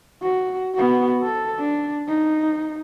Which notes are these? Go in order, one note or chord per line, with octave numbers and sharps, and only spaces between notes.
F#4
B3 F#4
A4
D4
D#4